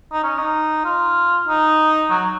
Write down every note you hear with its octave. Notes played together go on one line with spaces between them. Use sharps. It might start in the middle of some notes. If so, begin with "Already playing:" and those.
D#4
C#4
D#4
F4
D#4
F#3